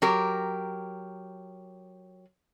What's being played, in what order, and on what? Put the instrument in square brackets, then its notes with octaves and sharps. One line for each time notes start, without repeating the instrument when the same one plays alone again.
[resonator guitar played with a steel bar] F#3 G4 A#4